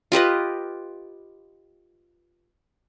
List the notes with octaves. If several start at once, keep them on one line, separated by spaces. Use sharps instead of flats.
F4 G4 B4 D#5